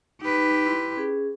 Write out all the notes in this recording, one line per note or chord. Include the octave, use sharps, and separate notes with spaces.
D#4 G4 B4
E4 C6
C#4 G#4